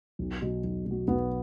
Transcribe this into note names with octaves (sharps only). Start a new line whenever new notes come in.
B1
B2 F#3
B1
B2 F#3
B1 B3